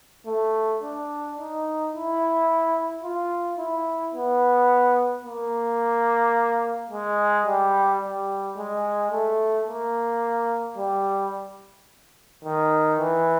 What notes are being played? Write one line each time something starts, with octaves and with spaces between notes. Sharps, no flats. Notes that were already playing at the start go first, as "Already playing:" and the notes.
A3
D4
D#4
E4
F4
E4
B3
A#3
G#3
G3
G3
G#3
A3
A#3
G3
D#3
E3